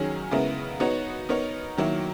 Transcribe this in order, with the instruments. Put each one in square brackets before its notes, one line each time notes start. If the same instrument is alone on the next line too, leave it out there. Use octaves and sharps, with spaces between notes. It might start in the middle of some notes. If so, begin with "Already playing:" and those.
Already playing: [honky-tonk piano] D#3 F#3 C#4 G#4
C#3 G#3 B3 E4 A#4
B3 D#4 F#4 C#5
B3 D#4 A#4 C#5
D#3 F#3 A#3 E4